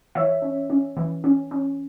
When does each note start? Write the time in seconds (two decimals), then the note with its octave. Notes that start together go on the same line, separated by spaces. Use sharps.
0.15 E3 C#5 E5
0.42 C#4
0.70 C#4
0.97 E3
1.24 C#4
1.51 C#4